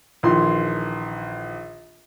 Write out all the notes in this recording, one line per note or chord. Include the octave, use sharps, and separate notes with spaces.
A#1 D#3 E3 F4 C6